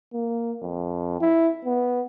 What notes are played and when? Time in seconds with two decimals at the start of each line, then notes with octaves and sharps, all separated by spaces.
0.13 A#3
0.62 F2
1.21 E4
1.65 B3